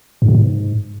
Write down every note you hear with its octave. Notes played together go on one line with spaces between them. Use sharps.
G2
B2
G#2